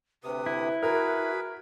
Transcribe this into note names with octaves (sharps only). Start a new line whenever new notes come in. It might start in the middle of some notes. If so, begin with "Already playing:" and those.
D2 C3 B4 D#6
E4
F#4 G#4 A#4 B4 B5